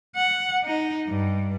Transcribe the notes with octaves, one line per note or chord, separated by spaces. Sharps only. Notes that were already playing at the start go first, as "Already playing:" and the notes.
F#5
D#4
G2